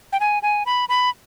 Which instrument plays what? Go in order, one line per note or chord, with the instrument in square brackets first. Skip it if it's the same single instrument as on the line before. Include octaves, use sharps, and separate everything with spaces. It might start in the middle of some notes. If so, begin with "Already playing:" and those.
[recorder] G5
G#5
G#5
B5
B5